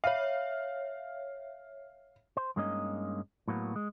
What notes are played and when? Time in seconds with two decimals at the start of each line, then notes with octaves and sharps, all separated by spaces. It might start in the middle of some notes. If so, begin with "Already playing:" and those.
0.04 C#5 E5 F5
2.37 C5
2.56 G2 G#3 A#3 C#4 D#4 D#5
3.48 A2 F#3 A#3 B3
3.76 G#3